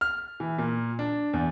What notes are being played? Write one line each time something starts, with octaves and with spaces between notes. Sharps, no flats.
F6
E3
A#2
D4
E2